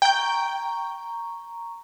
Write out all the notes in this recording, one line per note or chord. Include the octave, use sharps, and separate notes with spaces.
G5 A#5 C#6 G6